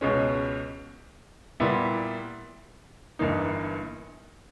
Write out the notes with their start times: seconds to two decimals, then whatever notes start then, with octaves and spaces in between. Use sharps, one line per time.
0.01 C#2 B2 G#3 C#4
1.60 A#2 G3 B3 E4
3.19 G1 G2 E3 A#3 D#4